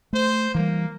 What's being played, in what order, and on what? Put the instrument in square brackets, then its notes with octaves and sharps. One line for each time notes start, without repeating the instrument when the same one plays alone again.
[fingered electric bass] A3 [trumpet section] C5
[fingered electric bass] E3 G3 [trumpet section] A#3